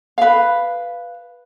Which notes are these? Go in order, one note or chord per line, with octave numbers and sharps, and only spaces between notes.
B4 F5